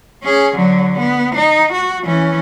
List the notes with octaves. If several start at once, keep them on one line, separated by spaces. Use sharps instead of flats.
C#4 G#4
D3 F#3
B3
D#4
F#4
E3 C#4